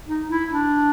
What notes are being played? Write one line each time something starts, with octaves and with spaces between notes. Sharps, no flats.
D#4
E4
D4